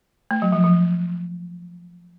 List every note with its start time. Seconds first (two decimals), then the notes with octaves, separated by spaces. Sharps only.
0.31 A3
0.42 F#3
0.52 F3
0.64 F3